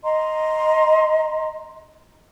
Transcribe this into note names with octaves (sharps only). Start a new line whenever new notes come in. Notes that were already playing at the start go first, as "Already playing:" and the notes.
D#5 A#5 C6